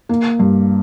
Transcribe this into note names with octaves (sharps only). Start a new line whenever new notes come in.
A#3
G2